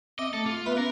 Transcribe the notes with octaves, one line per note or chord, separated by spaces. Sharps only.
C4 D#5 E5 D6
A3 A4
F4
B3 B4 E5 B5
C#4 A#4